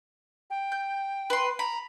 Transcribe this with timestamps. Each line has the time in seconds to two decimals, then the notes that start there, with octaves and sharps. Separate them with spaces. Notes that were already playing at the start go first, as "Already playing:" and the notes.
0.50 G5
0.72 G6
1.30 B4 C6
1.59 A#5 B5